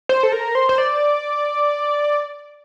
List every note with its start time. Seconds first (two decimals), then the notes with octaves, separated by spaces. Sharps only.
0.09 C5
0.23 A4
0.32 A#4
0.55 C5
0.69 C5
0.78 D5